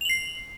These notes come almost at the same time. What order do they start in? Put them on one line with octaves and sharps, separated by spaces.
F7 F#7 C7